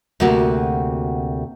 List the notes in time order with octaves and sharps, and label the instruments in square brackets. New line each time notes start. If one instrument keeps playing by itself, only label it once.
[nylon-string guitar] D2 C3 A#3 F#4 A5